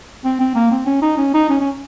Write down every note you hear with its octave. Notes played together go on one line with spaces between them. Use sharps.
C4
C4
A#3
C4
C#4
D#4
C#4
D#4
C#4
C#4